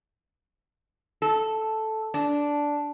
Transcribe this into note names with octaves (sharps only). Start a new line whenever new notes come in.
A4
D4